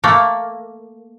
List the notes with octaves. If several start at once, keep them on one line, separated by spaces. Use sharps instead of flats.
A3 A#3